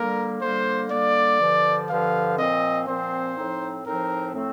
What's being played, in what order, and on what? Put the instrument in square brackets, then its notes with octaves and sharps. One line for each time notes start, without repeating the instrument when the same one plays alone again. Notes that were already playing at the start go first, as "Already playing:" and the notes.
Already playing: [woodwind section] D3 G3 A#3 [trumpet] A#4
[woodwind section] D3 G3 A#3 [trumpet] C5
[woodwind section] D3 G3 A#3 [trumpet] D5
[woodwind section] G2 D3 F3
[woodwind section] G2 D3 F3 [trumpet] F5
[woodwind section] A#2 F3 C4 [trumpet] D#5
[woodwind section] A#2 F3 C4 [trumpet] C5
[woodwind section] A2 F3 C4 D#4
[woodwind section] A2 F3 C4 D#4 [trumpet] A#4
[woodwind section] A2 A3 C4